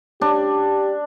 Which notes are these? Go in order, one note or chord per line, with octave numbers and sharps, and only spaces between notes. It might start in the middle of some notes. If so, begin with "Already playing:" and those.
D4 G4